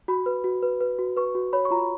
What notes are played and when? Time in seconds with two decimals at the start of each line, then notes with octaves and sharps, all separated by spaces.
0.08 F#4 B5
0.26 B4
0.44 F#4
0.63 B4
0.81 B4
0.99 F#4
1.17 B4 C#6
1.35 F#4
1.53 C#5 B5
1.65 C#6
1.71 F4 A#5
1.78 B5